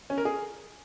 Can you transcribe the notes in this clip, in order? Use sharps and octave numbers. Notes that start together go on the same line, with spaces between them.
C#4
A#4
G#4